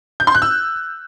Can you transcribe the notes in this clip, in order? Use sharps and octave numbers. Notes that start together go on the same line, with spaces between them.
G6
C6
F#6
E6